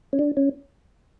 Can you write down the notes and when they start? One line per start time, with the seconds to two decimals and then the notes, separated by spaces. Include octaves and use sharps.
0.13 C#4
0.19 D4
0.37 C#4